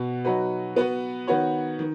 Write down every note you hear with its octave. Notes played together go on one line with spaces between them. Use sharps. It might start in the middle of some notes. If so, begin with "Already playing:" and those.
Already playing: B2 B3 F#4
F#3 D#4 F#4 B4
B3 F#4 B4
D#3 B3 F#4 C#5
D#3